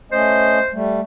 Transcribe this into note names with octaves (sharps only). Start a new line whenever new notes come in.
A3 C#4 C5 D#5
G3 A3